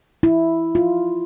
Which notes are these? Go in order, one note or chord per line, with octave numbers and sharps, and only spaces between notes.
E4
F4